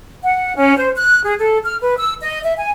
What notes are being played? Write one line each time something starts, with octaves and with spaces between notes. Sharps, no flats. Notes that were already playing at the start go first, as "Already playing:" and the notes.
F#5
C#4
C5
F#6
G#4
A4
F6
B4
E6
D#5
E5
G#5